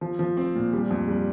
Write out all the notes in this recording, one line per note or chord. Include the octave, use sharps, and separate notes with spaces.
F3
F3
C4
A#2
G3
F2
G3